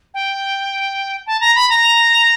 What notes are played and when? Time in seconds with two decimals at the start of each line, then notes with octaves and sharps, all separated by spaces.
0.14 G5
1.26 A5
1.41 A#5
1.55 B5
1.69 A#5